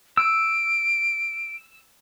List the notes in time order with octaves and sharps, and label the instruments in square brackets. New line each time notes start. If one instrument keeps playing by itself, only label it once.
[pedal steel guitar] E6 [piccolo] D7